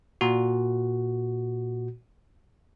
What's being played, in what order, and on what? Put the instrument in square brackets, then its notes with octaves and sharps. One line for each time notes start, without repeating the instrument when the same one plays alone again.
[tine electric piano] A#2 F#4